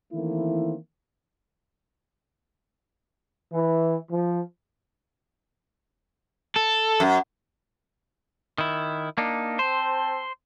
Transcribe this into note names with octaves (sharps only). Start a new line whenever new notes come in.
D#3 E3 A3 A#3 C4 E4
E3
F3
A4
F#2
D#3 E4
A#3 D4 D#4
C4 C5 A5